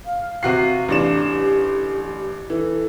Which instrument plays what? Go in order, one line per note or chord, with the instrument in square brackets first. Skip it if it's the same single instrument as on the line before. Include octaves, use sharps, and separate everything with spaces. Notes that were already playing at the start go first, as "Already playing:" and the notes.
[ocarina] F5
[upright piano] C3 F#4 C7
[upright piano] A1 D4 E7 [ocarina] G4
[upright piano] E3 [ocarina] A4